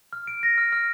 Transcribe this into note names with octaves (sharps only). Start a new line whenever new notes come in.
F6
D7
A#6
F6
F6